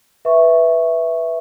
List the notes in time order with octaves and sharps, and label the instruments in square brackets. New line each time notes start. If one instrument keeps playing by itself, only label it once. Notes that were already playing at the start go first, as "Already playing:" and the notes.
[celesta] B4 E5 C#6